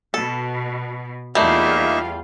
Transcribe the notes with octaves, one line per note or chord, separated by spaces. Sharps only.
B2 A4
E2 G3 A3 A#3 D#4 F4 E5 F5